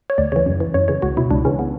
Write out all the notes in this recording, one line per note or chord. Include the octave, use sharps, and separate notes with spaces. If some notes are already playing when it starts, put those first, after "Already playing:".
C#5
D2 D5
C#3 E3 C#5
F#2
E3
F#2 C#5
C#3 E3 C#5
C#2 F#4
B2 E4
C#2 D4
C#3 E3 C#4
B3